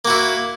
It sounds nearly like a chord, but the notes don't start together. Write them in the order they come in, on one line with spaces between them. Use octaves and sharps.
A#3 F#4 E4